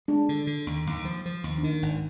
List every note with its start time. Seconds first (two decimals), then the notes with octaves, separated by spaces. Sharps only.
0.08 G#3 D4
0.29 D3
0.47 D3
0.67 D#2
0.87 D#2
1.05 F3
1.26 F3
1.44 D#2
1.58 D4
1.63 D#3 D#4
1.82 G#1